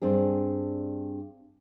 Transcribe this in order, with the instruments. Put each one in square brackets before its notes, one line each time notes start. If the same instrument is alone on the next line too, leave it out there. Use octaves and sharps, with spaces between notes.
[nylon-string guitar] G2 C4 D4 G#4